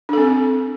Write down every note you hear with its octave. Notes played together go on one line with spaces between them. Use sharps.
C4 D4 A4